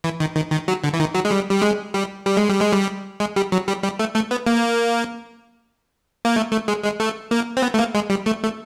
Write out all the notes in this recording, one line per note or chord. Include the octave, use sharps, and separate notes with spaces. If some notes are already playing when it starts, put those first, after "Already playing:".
E3
D#3
D#3
D#3
F#3
D3
E3
D#3
F#3
G#3
G3
G3
G#3
G3
G3
G#3
G3
G#3
G3
G#3
G3
F#3
G3
G3
A3
A3
B3
A#3
A#3
A3
A3
G#3
G#3
A3
A#3
C4
B3
A3
A#3
G#3
G3
A3
A3